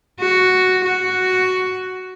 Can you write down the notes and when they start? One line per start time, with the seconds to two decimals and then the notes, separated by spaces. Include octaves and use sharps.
0.20 F#4
0.84 F#4